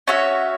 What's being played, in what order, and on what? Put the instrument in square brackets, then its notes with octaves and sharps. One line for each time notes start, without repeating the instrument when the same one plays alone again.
[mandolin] C#4 F#4 C#5 E5